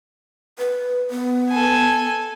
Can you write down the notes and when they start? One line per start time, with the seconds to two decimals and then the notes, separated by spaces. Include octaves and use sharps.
0.58 B4
1.10 B3
1.49 A4 G#5